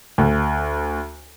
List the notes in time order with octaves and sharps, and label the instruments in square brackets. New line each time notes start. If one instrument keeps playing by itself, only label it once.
[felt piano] D2